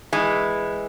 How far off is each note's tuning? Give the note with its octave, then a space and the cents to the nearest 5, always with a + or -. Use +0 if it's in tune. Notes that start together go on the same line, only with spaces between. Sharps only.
E3 +0 G#3 -10